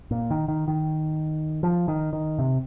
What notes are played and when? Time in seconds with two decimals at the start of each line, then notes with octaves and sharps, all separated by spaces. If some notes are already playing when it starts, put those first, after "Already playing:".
0.11 A#2
0.31 D#3
0.48 D#3
0.68 D#3
1.63 F3
1.88 D#3
2.13 D#3
2.39 C3